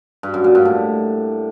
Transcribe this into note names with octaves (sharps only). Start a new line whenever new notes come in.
G2
F#2
A#2
G2
A2